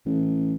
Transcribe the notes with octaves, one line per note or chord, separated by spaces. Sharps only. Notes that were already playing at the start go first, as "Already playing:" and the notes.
A1